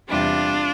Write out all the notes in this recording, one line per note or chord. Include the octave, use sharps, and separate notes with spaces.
E2 C3 G3 D4 F4